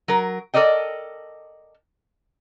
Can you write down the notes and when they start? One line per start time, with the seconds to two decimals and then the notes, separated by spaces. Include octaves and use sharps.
0.08 F#3 A#4
0.54 A4 A#4 D5 D#5 G5